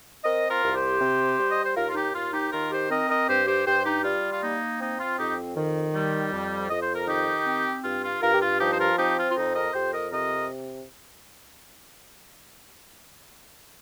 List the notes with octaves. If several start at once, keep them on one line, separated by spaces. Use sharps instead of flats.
C4 A#4 D#5
F4 A#4
C2
G4 C5
C3
G3
D#5
C5
D#2 F4 A#4
F4
D#4 G4
D#2 F4
D#4 G4
D#3 F4 A#4
G4 C5
C4 A#4 D#5
A#4 D#5
G2 G4 C5
G4 C5
G2 G4 C5
D#4 G4
G3 F4
F4
A#3 D#4
C4 D#4
F4
F2 D#4 G4
D#3
G3
F2
F2 D#5
C5
A#4
D#3 D#4 G4
C4
G2 F4
F4
G2 F4 A#4
G4
F4
F3 D#4 G4
C5
F4 A#4
C4 D#4 G4
F4
F4
F2 D#4
A#4 D#5
F2 G4 C5
A#4 D#5
C3 A#4 D#5